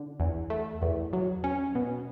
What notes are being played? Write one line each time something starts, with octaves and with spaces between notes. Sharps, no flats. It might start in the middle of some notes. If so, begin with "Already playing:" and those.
Already playing: D3
E2
A3
E2
F#3
C#4
B2